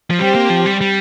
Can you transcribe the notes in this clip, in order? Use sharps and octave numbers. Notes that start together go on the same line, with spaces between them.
F3
G3 C4 G4 C5 G5
A#3
F3
G3
G3